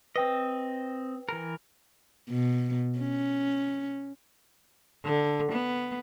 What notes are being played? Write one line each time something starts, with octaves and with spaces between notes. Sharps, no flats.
C4 B4 D#5 G5
E3 A#4
B2
C#4
D3
B3